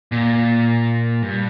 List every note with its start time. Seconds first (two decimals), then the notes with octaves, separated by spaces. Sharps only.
0.12 A#2
1.23 G2